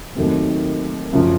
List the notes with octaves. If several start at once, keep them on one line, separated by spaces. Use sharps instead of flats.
D#2 D#3 F#3 A3 C4
F#2 C#3 F3